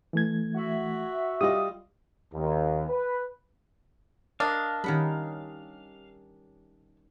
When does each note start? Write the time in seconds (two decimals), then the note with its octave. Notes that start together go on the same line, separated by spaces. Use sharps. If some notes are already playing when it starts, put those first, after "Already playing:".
0.13 E3 A3 G#6
0.55 F#4 E5
1.41 G3 F4 D#5 D#6
2.34 D#2
2.89 B4
4.40 D4 A#4 D#5 F5
4.84 D#3 G3 C#4 F#5 B5